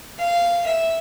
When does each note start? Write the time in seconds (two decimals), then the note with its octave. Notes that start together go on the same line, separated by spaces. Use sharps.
0.18 F5
0.66 E5